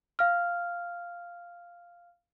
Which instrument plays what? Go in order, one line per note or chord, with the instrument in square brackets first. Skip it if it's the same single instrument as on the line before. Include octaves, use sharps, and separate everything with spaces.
[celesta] F5 F6